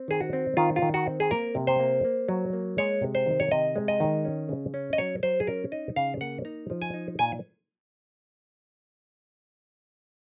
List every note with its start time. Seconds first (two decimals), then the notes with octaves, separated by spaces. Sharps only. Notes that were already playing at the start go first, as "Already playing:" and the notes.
Already playing: C4
0.08 D#3 G#4
0.20 F#4
0.33 C4
0.57 D#3 F4
0.76 F4
0.82 D#3
0.94 F#4
1.06 C4
1.20 G#4
1.31 A#3 A#4
1.55 C3
1.67 C5
1.80 A#3
2.04 A#3
2.28 F#3
2.53 A#3
2.78 G#3 C#5
3.02 C3
3.15 C5
3.26 D#3
3.40 C#5
3.51 C3 D#5
3.76 G#3
3.88 D#5
4.00 D#3
4.25 C#4
4.49 C#3
4.74 C#4
4.93 D#5
4.98 F#3 C#5
5.23 F#3 C5
5.40 G#4
5.47 C#4 A#4
5.72 D#4 D#5
5.96 C#3 F5
6.21 A#3 F#5
6.45 D#4 A#5
6.70 F3
6.82 G#5
6.94 D#4
7.19 A#2 G#5